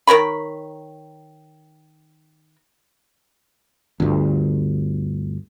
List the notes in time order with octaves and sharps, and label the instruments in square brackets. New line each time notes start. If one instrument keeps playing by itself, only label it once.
[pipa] D#3 A#4 C#5 B5
[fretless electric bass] G1 D2